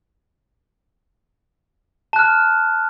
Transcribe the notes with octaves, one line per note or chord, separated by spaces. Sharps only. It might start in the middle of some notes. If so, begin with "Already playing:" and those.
A5 F6 F#6